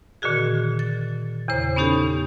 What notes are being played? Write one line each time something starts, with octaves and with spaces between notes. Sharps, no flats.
A#2 D3 D#3 F#4 G#4
A6
E2 C#3 C5
B3 C#4 D#4 G4 A4